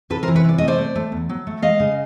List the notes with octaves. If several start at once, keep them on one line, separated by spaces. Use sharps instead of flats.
C3 A4 B4
A#4 C5
E3
B4 C#5
C3 D5
A3 D#5
C5 D5
A3
A3
E2
F#3
A3
G#3 D#5 F5
C#3